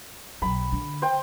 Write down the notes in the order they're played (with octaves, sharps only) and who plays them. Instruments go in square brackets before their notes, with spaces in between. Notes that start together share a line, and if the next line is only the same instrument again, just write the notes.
[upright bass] B1 F#3 [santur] B5
[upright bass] D3
[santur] C5 G5